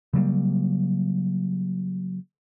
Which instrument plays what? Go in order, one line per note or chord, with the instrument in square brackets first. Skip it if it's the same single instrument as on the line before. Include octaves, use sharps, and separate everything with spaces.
[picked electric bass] C#3 F#3 G3 A#3